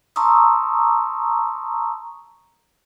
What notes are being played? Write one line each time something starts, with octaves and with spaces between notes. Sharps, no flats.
A5 A#5 C6 C#6 D#6 E6